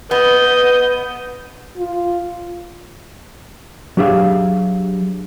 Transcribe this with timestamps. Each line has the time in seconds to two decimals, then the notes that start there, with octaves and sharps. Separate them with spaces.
0.11 B3 B4 D#5 G6
1.77 F4
3.97 F#3 D4 G4 G#4 E5 F5